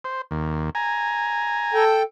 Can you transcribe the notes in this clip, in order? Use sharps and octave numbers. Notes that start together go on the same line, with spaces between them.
C5
D#2
G#5 A#5
A4 G5